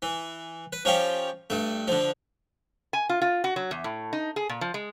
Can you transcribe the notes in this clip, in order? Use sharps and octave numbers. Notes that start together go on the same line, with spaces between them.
E3
B4
F3 C#4 F4 G4
G2 A3
D3 F3
G#5
F4
F4
F#4
F#3
E2
A2
D#4
G#4
A#2
F3
G#3